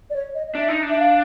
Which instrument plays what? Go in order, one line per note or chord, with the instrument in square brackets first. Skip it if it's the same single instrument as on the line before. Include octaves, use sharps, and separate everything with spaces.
[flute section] D5
C#5
D#5
D#5
[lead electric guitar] D4 [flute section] E5
[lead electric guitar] D#4
D4
[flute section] E5
F5